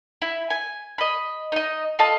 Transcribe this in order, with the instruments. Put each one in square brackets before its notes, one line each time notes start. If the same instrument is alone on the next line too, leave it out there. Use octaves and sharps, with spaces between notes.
[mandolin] E4
G#5
D#5 B5
D#4 D#5
F4 A4 D#5 A5